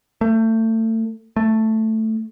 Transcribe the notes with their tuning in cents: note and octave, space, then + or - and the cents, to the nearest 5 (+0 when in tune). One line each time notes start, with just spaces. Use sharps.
A3 +30
A3 +5